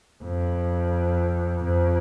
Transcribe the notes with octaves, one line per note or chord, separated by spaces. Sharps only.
F2
F2